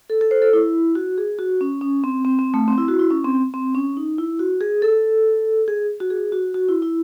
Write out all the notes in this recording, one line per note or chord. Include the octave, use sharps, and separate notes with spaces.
A4
A4
C5
A4
E4
F#4
G#4
F#4
C#4
C#4
C4
C4
C4
A3
C4
E4
F#4
E4
C#4
C4
C4
C#4
D#4
E4
F#4
G#4
A4
G#4
F#4
G#4
F#4
F#4
E4
E4